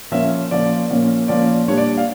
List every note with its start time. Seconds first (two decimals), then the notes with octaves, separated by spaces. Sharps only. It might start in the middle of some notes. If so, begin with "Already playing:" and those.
0.11 A#2 F3 A#3 C#4 E5
0.51 A#2 F3 A#3 C#4 D5
0.90 A#2 F3 A#3 C#4
1.28 A#2 F3 A#3 C#4 D5
1.68 A#2 G3 D4 C#5
1.78 D5
1.97 F5